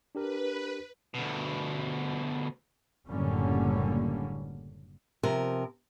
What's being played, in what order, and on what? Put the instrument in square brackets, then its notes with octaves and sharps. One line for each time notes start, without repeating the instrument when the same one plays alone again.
[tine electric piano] D4 G4 A#4 [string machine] B4
[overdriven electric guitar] D2 B2
[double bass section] F#1 A2 D3 G3 A#3 C#4
[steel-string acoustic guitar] C3 F3 A#4